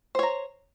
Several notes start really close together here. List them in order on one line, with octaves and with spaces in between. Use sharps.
C5 C#5 A#5